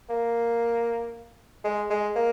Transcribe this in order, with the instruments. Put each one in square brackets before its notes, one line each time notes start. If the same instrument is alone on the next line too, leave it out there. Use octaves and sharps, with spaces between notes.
[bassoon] A#3
G#3
G#3
A#3